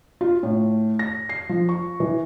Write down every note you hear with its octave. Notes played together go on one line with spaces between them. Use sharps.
F4
A2
A#6
C7
F3
C#6
E3